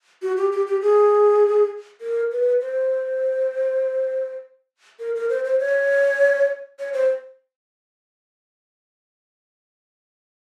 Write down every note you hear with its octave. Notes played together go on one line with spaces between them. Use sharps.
F#4
G4
G4
G4
G#4
A#4
B4
C5
A#4
A#4
C5
C5
C#5
C#5
C5